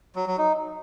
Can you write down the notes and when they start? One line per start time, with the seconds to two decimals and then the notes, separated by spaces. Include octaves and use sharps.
0.16 F#3
0.27 F#3
0.38 D#4